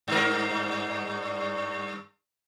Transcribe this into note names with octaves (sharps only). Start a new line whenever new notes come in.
G2 A#4